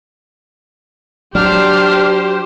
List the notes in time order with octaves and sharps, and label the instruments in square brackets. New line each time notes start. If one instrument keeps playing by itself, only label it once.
[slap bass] F#3 [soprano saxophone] D4 [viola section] G4 C5 [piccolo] F6